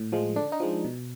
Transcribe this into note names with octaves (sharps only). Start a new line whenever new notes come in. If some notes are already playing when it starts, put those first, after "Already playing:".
Already playing: A2
F3 G#3
D3 D4
D#4
F3 G#3
B2